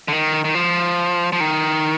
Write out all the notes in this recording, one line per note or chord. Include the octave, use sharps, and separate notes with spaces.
D3
D#3
D#3
F3
F3
D#3